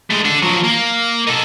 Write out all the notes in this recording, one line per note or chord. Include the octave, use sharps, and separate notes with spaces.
G#3 A3
D4 A4
F3 F#3
A#3
D#4 A4